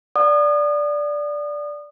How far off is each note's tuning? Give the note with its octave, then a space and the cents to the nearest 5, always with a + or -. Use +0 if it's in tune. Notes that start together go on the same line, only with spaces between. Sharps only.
D5 +0 F#5 -20 D#6 -35